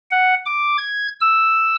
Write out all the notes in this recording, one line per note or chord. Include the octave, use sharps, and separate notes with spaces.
F#5
D6
G#6
E6